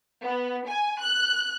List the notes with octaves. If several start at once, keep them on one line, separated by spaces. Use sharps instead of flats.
B3
G#5
F#6